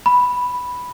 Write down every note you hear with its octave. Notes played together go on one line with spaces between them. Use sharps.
B5